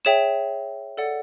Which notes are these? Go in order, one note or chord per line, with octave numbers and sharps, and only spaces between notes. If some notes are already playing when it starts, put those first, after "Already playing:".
G#4 C#5 E5 G5 E7
A4 D5 F#5